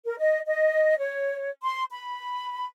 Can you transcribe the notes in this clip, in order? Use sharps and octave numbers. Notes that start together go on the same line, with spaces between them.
A#4
D#5
D#5
C#5
C6
B5